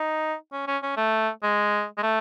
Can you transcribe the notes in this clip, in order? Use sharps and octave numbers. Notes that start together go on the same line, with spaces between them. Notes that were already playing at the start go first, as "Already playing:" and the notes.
Already playing: D#4
C#4
C#4
C#4
A3
G#3
G#3
A3